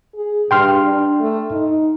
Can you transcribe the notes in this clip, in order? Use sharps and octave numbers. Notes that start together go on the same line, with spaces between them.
G#4
G2 G5 C6 F6
D4
A3
D#4